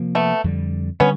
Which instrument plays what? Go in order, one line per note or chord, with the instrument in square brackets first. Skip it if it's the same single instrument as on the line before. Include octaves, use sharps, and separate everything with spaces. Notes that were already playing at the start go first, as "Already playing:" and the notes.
Already playing: [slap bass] C3 F3 A#3
[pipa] A3 B3
[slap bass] F2 D3 G3
[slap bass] D3 G3 [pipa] B3 C#4